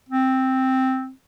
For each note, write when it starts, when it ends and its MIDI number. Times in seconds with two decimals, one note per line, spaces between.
0.09 1.12 60